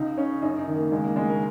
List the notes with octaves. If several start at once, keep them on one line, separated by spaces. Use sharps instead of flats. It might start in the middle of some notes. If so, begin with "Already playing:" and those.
Already playing: C#2 D#4
C#3 C#4
F#2 D#4
D#4
D#3
A#3
C#2 G#3
A#3
C#3 G#3
A#4